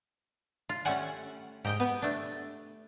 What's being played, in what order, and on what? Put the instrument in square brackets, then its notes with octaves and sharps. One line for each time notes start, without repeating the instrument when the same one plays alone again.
[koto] F4
[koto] G3 A3 C#4 [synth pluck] F#5 G#5
[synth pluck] G#2 [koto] G4 D#5 G5
[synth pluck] B3
[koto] A3 D4